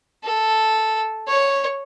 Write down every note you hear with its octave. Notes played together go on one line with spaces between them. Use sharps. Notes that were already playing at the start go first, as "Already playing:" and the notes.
A4
C#5